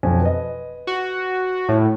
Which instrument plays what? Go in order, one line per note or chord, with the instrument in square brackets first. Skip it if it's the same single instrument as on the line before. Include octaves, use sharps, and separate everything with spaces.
[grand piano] B1 F2 G#5
B4 D#5
[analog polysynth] F#4
A2